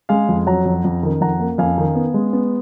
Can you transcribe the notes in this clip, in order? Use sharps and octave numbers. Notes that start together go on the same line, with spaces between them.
G#3 F5 G#5
F2
F#3 F#5 A#5
F2
F2
D#3
F2 F#5 A#5
A#3
F2 F5 G#5
D#3
B3
G#3
B3